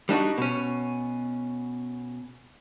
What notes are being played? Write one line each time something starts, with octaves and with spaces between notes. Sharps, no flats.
G3 D4 D#4 F#4
B2 C#4